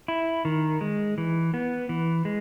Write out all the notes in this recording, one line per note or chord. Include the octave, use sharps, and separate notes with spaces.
E4
D#3
G#3
E3
B3
E3
G#3